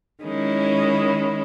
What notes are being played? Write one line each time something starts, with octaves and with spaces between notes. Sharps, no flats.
D#3 G#3 C#4 E4